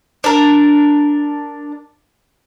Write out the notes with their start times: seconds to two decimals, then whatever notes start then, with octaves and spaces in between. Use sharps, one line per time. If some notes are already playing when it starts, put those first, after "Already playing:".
0.24 D4 A#4